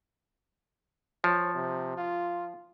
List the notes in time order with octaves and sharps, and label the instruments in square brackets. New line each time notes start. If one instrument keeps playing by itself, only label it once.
[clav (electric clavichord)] F3 [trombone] C#5
[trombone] C3
F4